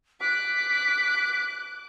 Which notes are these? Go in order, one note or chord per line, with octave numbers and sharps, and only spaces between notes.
D6 F#6 B6